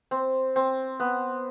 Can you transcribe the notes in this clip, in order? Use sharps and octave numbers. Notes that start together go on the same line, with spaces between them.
C4
C4
B3